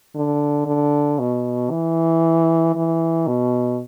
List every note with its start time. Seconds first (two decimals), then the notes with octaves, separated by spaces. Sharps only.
0.15 D3
0.66 D3
1.19 B2
1.70 E3
2.75 E3
3.27 B2